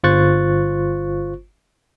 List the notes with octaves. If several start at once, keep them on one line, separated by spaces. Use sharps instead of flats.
G1 F4 C5 C#6 F#6 A6